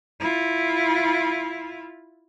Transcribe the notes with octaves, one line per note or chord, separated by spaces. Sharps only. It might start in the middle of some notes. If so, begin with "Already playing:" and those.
E4 F4